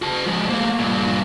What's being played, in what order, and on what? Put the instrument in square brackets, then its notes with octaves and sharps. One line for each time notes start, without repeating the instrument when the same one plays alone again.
[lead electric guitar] F#4 A5
F3 G#3
A3 A#3
G2 A#2